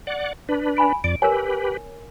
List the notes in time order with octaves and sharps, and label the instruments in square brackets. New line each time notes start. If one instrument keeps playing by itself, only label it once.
[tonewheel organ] D5 F#5
D4 B4
[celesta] G#5 B5 D7
[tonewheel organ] F2 D5 [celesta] D7
[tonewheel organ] G4 B4 [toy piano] A#4 G#5 [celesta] C#5